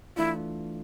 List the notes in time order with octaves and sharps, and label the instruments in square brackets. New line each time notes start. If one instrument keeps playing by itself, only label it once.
[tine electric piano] E3 A3 D4 F4 [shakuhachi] E4